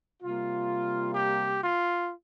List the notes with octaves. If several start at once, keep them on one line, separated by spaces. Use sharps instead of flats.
C3 G3 A#3 F4
G4
F4